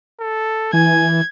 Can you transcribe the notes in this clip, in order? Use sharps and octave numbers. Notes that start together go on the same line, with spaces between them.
A4
E3 G#5 G#6